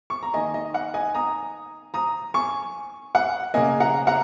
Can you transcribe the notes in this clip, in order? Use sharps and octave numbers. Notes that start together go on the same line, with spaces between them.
C#6
A#5
D#3 A#3 D#5 G#5
D#5
F#5
D#5 G#5
A#5 D#6
A#5 D#6
G#5 C#6
F#5
C#3 A#3 D#5 G#5
F#5 A#5
F#5 A#5